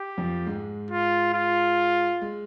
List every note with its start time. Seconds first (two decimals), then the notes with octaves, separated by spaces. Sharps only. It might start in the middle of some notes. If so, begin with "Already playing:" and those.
Already playing: G4
0.18 F2 F3
0.46 G#2 G#3
0.91 F4
1.34 F4
2.22 G#3